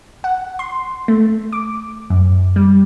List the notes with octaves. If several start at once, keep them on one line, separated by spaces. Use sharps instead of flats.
F#5
C6
A3
D6
F#2
G3